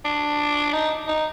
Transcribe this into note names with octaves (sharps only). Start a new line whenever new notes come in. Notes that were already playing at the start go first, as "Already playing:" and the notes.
D4
D#4
D#4